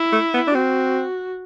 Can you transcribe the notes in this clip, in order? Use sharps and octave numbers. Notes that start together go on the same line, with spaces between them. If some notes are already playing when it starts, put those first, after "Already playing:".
Already playing: E4
A3
B3
D4
C4 F#4